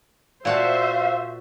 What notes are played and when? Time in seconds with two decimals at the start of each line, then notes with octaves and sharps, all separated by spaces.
0.45 A#2 F#4 C5 E5 F5 A5